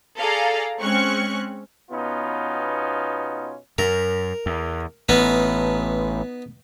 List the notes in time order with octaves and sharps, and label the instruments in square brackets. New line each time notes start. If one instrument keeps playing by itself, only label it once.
[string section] G#4 A4 D5 F5 A#5
G#3 C4 C#4 C#6 F#6
[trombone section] B2 B3 C#4 D#4 F4
[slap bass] F#2 [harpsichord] A#4
[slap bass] E2
[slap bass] A1 [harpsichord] B3 D#4 B4